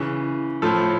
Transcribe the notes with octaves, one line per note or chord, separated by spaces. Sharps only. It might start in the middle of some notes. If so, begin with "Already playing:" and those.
Already playing: C#3 E3
A2 F3 A4